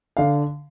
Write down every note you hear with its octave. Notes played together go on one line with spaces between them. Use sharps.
D3 F5